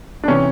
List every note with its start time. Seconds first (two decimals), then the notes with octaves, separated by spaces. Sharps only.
0.24 D4
0.28 C3 E3 C#4